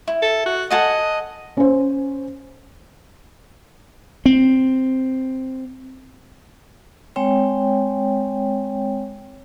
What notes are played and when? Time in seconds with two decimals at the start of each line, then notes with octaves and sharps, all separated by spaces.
0.08 E4
0.22 A4
0.46 F#4
0.71 A4 D#5 F#5 G#5
1.57 C#4 C5
4.26 C4
7.16 G#3 C4 C#5 G5